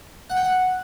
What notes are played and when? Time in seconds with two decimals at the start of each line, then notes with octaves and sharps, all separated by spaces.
0.30 F#5
0.37 G5
0.44 F#5